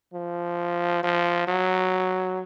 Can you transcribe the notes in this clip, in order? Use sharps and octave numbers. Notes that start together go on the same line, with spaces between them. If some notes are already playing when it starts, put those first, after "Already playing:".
F3
F3
F#3